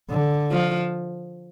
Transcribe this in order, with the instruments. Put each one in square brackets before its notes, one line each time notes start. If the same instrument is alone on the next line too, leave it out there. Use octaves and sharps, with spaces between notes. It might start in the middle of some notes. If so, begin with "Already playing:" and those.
[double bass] D3
[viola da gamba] F3